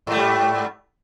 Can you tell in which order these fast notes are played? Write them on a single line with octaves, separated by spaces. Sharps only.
G#2 A3 G3